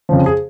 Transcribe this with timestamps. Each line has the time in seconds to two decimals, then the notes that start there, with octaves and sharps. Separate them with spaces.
0.09 F2 C#3 F3
0.26 G#4